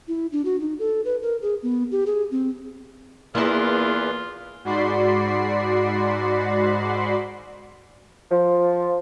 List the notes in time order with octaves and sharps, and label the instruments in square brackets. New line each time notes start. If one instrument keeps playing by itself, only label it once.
[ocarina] E4
D4
F#4
D#4
A4
B4
A#4
G#4
B3
G4
G#4
C4
[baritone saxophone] E2 [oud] A#3 E4 [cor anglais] F4 [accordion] G#4 B4 D5
[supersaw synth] G#2 F#4 D5 B5 C6 C7
[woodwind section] F3